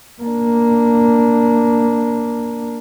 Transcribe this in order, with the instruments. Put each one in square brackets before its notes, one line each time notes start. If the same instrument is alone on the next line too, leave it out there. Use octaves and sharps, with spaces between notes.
[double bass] A#3 D4